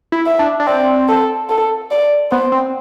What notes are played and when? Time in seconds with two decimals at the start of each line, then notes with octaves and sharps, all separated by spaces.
0.12 E4
0.26 E5
0.39 D4
0.60 D4
0.67 C4 D5
1.09 A4
1.50 A4
1.91 D5
2.31 B3 C5
2.52 C4